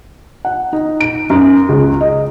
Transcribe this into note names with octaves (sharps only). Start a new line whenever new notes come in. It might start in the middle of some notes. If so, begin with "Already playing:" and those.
F#5
D#4
D7
F#2
C#2
D#5